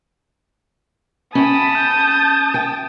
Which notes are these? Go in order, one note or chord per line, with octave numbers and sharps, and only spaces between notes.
C#4 G5 A5 B5 D#6
G6
G5